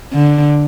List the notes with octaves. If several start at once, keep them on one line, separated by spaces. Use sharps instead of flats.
D3